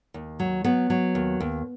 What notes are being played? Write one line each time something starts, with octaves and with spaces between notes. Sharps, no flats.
D#2
F#3
F#3 B3
F#3
D#2
D#2